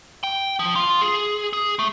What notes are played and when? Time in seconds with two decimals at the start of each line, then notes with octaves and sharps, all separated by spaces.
0.23 G5
0.59 F3
0.76 F4
1.02 G#4
1.53 G#4
1.79 A3